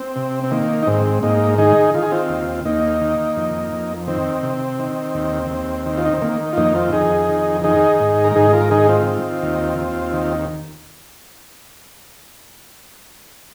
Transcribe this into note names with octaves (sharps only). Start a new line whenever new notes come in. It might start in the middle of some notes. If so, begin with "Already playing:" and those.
Already playing: C4
C3
C4
D#3 A#3
D#4
G#2 C4
G#2 A#3 D#4
D#3 D#4 G#4
D#3 F4
G#4
C4 F4
D#2
D#2 A#3 D#4
D#3
F2
F2
D#3 C4
C3
D#3
D#2
D#2
D#3
F4
D#4
C4
D#3 A#3
F4
F2 A#3 D#4
C4 F4
F2 D#4 G#4
D#3
D#3 D#4 G#4
G#2
A#4
G#2 D#4 G#4
F4 A#4
D#3 D#4 G#4
C4 F4
D#3
D#2
D#2
D#3